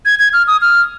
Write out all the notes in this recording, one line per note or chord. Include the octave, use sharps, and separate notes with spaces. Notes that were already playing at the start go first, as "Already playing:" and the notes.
G#6
G#6
F6
D#6
F6